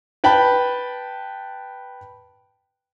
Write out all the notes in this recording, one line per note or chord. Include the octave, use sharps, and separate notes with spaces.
B4 G5 A5 B5